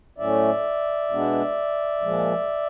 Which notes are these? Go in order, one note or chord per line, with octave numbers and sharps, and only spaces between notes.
A2 F#3 A3 C#4 D5 E5
B2 G#3 B3 D4
A#2 F3 G#3